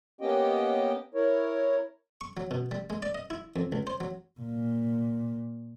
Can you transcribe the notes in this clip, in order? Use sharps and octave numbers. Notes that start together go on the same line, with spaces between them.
A#3 B3 C#4 G4 D#5 G5
E4 A#4 C#5
C#6
F#3
B2
G3
G#3
D5
D#5
E4
F2
C#2
C5
F#3
A#2